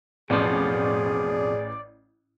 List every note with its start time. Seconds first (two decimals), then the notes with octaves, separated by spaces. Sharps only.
0.30 A1 F2 B2 F3 G#4 D5